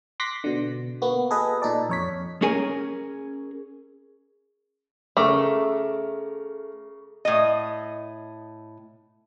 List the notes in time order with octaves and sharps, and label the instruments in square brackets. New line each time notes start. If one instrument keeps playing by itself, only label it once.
[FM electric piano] C6 D6 F#6 A#6 B6
B2 D3
A#3 B3 F#4
G#4 A4 B4 D#5
A#2 D#4 A4 D5
F2 C#5 B6
[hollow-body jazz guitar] C#4 G#4 A#4 G#5
[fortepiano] C#3 A#4 D6 [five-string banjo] A3
[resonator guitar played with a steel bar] A2 D#5